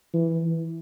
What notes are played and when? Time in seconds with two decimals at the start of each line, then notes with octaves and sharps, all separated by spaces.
0.14 E3